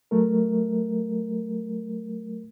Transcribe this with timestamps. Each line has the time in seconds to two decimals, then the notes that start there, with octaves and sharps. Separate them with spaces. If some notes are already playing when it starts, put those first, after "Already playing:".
0.11 F#3 A3 A#4